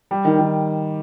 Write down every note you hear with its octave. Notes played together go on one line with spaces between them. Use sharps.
G3
D#3
D#3